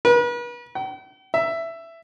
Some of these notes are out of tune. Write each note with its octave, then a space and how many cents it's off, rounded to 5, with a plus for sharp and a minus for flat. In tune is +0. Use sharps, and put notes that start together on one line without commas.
B4 -40
G5 -45
E5 +10